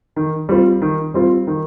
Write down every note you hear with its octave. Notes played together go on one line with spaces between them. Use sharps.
D#3
G3 C4 F4
D#3
G3 C4 F4
D#3